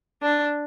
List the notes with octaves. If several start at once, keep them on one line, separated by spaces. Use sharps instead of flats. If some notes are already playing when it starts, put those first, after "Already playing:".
D4